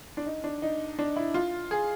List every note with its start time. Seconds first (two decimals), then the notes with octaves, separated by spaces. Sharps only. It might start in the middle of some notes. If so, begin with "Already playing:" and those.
0.17 D4
0.26 D#4
0.44 D4
0.62 D#4
0.99 D4
1.16 E4
1.34 F4
1.71 G#4